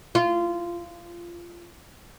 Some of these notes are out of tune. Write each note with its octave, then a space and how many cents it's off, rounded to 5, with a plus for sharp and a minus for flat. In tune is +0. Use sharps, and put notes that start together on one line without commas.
F4 -20